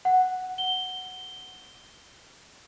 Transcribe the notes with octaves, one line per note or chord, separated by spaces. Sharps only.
F#5
G7